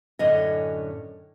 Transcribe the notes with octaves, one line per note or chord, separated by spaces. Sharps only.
F#2 A2 D3 C#4 D#5